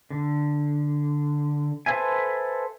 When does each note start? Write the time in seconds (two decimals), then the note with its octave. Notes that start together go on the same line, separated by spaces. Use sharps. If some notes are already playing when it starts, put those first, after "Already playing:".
0.10 D3
1.86 A4 B4 C5 E5 G#5